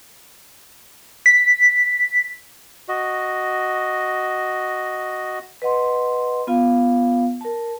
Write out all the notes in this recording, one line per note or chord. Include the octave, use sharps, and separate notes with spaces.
B6
F#4 D#5
B4 D#5 F#5 C6
B3 F4 F5
A#4 A5